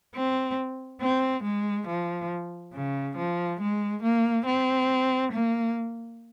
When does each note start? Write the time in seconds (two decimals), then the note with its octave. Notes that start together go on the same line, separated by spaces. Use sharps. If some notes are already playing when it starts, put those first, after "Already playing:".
0.15 C4
1.01 C4
1.44 G#3
1.87 F3
2.74 C#3
3.16 F3
3.61 G#3
4.03 A#3
4.46 C4
5.33 A#3